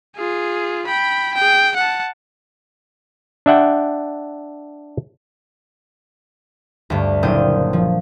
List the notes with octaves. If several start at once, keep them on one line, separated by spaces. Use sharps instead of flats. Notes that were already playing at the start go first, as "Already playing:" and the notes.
F4 G#4
G5 B5
G#4 G5
F#5 A5
D4 E5 F#5 G5
D2 G2
F#1 A#2 C4 D4 D#6 G6
F3